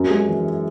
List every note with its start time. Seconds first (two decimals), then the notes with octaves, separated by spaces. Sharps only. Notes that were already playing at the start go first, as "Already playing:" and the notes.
Already playing: F#2
0.10 G#3
0.28 E3